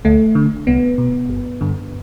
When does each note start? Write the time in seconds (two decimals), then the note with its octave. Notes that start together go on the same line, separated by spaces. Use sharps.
0.05 D2 A3
0.35 D3
0.67 C2 B3
0.98 B2
1.29 G1
1.61 G2 D3